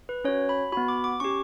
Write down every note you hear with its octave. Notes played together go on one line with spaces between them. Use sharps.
B4
C#4 F#4 C#5
B5
B3 F#4 B5
D6
D6
C#4 G4 C#6